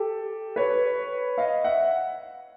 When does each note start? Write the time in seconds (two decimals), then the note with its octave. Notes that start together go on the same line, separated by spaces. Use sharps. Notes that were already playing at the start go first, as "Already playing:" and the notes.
Already playing: G4 A4
0.56 B4 C#5
1.38 D#5 F5
1.64 E5 F#5